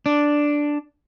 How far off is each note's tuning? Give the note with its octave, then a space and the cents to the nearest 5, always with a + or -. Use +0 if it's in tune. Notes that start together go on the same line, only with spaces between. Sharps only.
D4 +0